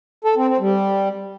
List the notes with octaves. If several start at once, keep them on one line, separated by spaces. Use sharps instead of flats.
A4
C4
C4
G3